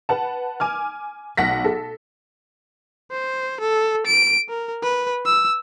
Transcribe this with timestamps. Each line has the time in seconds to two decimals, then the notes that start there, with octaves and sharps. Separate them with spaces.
0.09 B4 F#5 A5
0.60 G#5 D6 F6
1.37 B1 F#5 A#6 B6
1.65 A4
3.12 C5
3.61 A4
4.07 D7
4.49 A#4
4.83 B4
5.26 E6